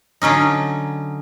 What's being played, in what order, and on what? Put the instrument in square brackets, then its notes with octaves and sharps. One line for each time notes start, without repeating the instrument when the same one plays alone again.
[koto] D3 F#3 C#4 D#4